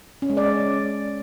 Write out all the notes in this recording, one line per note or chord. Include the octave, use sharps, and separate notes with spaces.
C#4
G#3
D5